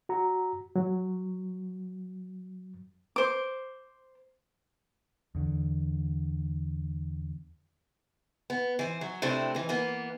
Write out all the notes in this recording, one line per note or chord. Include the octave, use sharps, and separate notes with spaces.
F#4 A#5
F#3
C5 D6
E2 D3
B3
E3 C5
F#3
C3 A3 C4 D4 E4
D#2 E3
E3 A#3 B3